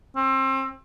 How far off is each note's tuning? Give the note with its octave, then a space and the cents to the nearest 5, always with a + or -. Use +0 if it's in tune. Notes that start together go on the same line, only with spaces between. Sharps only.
C4 +30